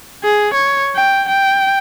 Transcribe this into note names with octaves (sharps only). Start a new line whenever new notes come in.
G#4
C#5
G5
G5